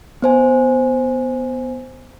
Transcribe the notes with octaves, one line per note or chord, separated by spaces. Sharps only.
B3 C5 G#5